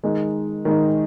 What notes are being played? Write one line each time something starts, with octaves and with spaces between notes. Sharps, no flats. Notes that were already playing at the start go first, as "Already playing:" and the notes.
D#3 G#3 D#4
D#3 G#3 D#4